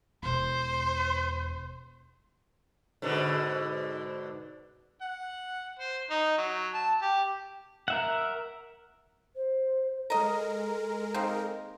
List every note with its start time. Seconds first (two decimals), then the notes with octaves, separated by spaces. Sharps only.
0.23 E1 C5
3.02 G#2 B2 D3
5.01 F#5
5.79 C5
6.10 D#4
6.38 F#3
6.74 A5
7.02 G4
7.88 A#4 E5 F#5
9.36 C5
10.10 G#3 A4 A#4 D#5 A#5
11.14 A#3 C4 D#4